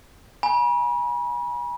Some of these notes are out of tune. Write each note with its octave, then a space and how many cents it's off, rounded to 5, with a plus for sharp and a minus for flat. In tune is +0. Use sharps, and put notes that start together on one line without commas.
G#5 +0 B5 -40